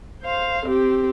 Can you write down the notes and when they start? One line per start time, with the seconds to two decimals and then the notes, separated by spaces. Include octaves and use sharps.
0.23 C5 F5
0.66 C4 G4